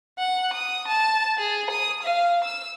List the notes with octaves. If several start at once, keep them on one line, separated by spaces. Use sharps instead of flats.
F#5
D#6
A5
G#4
D#6
F5
E6